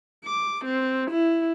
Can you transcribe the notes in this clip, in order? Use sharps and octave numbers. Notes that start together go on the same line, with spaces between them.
D6
C4
E4